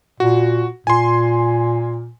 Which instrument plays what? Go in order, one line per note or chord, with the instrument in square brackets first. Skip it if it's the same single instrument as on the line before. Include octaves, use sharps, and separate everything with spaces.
[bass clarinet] A#2 [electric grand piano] F#4
[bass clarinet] A#2 [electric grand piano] G#5 C6